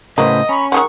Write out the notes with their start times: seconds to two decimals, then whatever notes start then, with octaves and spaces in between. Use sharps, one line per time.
0.18 A2 C#3 A#3 F#4 B4 C5 D#5
0.49 C#4 A#5 B5 C#6
0.72 D#3 F3 G#3 F#5 C#6